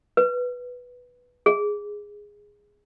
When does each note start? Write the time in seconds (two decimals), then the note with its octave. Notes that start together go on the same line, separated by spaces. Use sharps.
0.17 B4
1.46 G#4